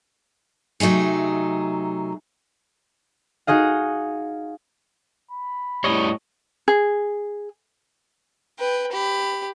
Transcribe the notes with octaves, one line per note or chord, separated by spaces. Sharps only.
C3 F#3 A3 D#4 G#4
D#4 F#4 G#4 D#5 F5
B5
A2 G3 C#5 D#5
G#4
B4 G5
G4 B5